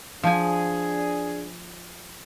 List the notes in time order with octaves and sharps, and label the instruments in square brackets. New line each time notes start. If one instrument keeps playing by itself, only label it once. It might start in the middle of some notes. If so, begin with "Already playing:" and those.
[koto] F3 G#5 [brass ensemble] D4 G#4